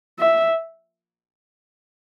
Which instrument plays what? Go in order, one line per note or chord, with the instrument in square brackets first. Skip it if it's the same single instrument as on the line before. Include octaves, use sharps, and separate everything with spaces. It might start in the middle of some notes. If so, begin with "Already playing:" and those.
[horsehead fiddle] E5